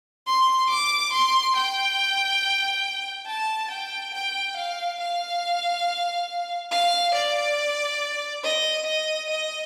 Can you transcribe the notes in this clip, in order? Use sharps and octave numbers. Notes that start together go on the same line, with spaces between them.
C6
D6
C6
G5
A5
G5
G5
F5
F5
F5
D5
D#5
D#5
D#5